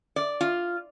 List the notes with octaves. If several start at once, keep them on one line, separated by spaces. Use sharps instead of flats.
D5
F4